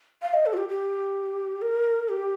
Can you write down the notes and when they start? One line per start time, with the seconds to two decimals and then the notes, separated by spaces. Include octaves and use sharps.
0.22 F5
0.34 D#5
0.46 A4
0.53 F4
0.57 G4
0.69 G4
1.62 A#4
2.09 G4